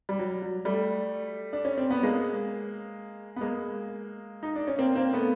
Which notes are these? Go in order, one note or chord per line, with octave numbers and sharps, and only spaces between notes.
G3
F#3
F#3
G3 A3
D4
C#4
C4
B3
G#3 A#3
B3
G#3 A#3
D#4
D4
C#4
A#3 C4
A#3 C4
A3 B3